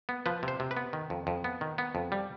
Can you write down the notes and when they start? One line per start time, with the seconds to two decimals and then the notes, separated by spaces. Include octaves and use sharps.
0.09 B3
0.26 F3 B4
0.43 C3
0.48 C5
0.60 C3
0.71 B4
0.77 B3
0.93 D#3
1.10 F2
1.27 F2
1.44 B3
1.61 D#3
1.78 B3
1.95 F2
2.12 G3